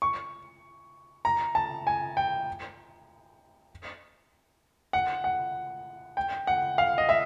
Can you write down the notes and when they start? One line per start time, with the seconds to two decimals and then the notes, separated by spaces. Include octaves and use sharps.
0.02 C#6
1.25 A#5
1.55 A5
1.87 G#5
2.17 G5
4.93 F#5
5.24 F#5
6.17 G5
6.47 F#5
6.78 F5
6.98 D#5
7.09 E5